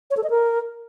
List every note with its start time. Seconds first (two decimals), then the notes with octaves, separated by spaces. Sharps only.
0.11 C#5
0.17 A4
0.24 D#5
0.30 A#4